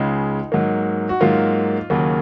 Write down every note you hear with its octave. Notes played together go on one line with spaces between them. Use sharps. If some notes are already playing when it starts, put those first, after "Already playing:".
Already playing: C#2 C#3 G#3 D#4
G#2 F#3 A#3
F#4
G#2 F#3 A#3 F4
D#2 C#3 F#3 A#3